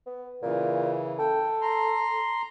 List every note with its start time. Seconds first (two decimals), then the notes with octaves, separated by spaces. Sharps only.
0.06 B3
0.42 A#2 C#3 E3
1.19 A4 G5
1.61 A#5 C6